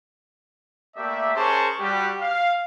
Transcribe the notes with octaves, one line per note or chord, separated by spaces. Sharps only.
A3 A#3 G4 D5 E5
C#4 G#4 A#4 C5 A5 C#6
G3 F#4 G4
F5